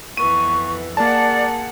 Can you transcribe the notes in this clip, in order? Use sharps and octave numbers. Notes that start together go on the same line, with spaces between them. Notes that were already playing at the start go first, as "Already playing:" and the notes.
F2 E3 B3 C#6 D#7
A#3 G#4 A#4 D5 F#5 A5